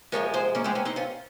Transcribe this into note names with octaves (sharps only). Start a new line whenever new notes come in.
F#2 C#3 F3 G#3 A#4 C#5
G#4 C5
A#3 C#4
G#3 C4
A#3 C#4
C4 D#4
C#4 F4